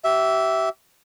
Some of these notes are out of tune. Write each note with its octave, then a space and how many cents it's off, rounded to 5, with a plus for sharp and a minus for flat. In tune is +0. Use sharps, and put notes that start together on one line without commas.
G4 -35 E5 +0